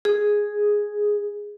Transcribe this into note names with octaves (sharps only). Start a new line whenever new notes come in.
G#4